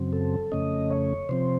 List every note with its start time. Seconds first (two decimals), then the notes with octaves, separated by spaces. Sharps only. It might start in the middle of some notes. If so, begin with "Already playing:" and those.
Already playing: F#2 C#3 F#3 C4
0.13 A4
0.52 F2 C#3 A3 C#4 D#5
0.90 C#5
1.29 C3 F3 C4 C5